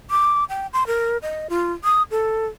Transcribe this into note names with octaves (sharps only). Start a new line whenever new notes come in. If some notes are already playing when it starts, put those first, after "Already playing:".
D6
G5
C6
A#4
D#5
F4
D#6
A4